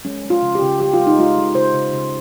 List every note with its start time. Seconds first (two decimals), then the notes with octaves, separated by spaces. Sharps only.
0.05 G#3 C#4
0.24 G#3
0.30 F4
0.42 C#3
0.55 G4
0.61 C#3
0.80 C#3 G4
0.93 F4
0.99 G#3
1.07 D#4
1.18 G#3 F4
1.37 G#3
1.55 C#3 C5
1.74 C#3
1.93 C#3